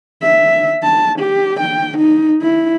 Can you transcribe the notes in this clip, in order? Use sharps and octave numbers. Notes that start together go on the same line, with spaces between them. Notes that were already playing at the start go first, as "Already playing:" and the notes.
E5
A5
G4
G5
D#4
E4